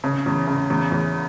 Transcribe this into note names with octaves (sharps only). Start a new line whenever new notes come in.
C#3
E2
C#3
E2
E2